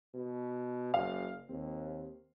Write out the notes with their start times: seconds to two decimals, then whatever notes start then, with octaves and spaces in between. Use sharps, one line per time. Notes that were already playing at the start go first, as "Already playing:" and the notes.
0.14 B2
0.94 F#1 F5
1.49 D#2 C4